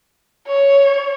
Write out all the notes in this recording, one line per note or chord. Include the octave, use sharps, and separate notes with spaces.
C#5